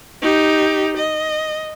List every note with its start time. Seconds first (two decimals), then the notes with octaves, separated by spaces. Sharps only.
0.22 D#4 G4
0.97 D#5